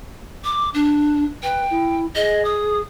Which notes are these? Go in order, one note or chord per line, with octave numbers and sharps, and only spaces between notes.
D6
D4
B4 G5
E4
G#4 D#5
D#6